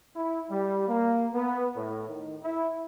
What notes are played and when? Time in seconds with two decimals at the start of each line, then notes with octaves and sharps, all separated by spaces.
0.15 E4
0.50 G3
0.88 A#3
1.34 B3
1.75 A2
2.08 D#3
2.43 E4